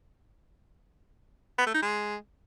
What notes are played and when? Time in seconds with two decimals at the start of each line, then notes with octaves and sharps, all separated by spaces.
1.58 B3
1.66 A3
1.74 D#4
1.82 G#3